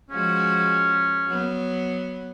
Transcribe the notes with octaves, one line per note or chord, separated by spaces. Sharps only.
F3 G#3 C#4 F#4
F#3 B3